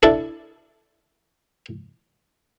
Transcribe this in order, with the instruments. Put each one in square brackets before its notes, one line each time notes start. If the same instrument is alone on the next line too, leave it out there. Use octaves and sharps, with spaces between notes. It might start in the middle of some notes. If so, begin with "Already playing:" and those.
[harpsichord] D4 E4 A4